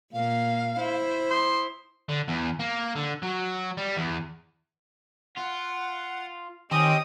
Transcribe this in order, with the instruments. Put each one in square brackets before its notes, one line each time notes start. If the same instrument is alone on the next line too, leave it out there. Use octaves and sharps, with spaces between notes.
[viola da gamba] A#2 A#3 [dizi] F5
[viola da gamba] E4 C5
[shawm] C6 [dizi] D#6
[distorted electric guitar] D3
E2
A#3
D3
F#3
G3
E2
[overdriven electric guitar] F4 [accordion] F#5
[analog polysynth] D#3 D7 [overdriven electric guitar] C4 [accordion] C#4 G4 D#5 [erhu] D#6